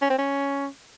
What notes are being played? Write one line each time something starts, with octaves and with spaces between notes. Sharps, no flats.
C#4
C4
C#4